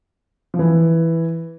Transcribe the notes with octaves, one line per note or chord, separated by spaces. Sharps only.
F3
E3